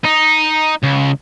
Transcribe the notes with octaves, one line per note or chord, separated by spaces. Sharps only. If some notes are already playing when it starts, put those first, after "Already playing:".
D#4
C#2